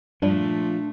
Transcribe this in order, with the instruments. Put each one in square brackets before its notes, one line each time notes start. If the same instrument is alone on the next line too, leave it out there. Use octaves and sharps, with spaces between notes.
[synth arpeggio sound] G2 G3 [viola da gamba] A#2 A3 [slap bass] F3 [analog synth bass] D4